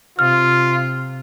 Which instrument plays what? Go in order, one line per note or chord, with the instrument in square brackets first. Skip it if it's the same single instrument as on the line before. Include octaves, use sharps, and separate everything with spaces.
[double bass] C3 [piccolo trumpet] F4 [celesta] F6